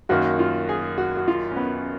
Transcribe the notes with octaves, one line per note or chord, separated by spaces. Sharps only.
F#2 D#3 A#3 F#4
F4
G#4
F#4
F#4
F4
C#4
B3